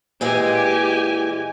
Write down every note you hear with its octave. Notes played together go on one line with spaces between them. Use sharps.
A#2 E3 G#3 G4 G#5